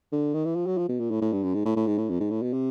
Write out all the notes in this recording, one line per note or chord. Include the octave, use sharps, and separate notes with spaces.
D3
D#3
E3
F3
F#3
F3
B2
A#2
A2
A2
G2
F#2
G#2
A2
A2
G#2
A2
F2
G#2
A2
B2
C3